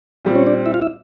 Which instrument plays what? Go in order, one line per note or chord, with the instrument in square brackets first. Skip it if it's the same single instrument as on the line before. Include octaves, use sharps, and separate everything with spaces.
[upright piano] A#2 G3 C4
[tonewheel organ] C#4 C#5
D4 D5
E4 E5
F4 F5
E4 E5